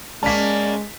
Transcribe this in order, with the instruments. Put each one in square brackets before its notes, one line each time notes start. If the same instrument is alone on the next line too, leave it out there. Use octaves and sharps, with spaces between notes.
[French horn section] G#3 [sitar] A#3 C#4 [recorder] D5 [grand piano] A5 B6